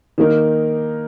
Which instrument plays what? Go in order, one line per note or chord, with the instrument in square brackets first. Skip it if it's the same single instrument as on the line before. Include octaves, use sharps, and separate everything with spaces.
[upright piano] D#3 A#3 D#4 A#4